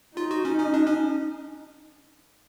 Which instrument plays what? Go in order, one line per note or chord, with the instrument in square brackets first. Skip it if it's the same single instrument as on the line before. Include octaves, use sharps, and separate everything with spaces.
[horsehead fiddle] D#4 [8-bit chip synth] F4
[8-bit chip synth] F#4
C#4
C#4
D4
C#4